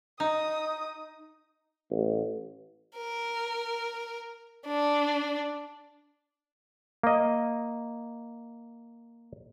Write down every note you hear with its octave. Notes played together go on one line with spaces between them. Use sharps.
D#4 D#6
A1
A#4
D4
A#3 D#5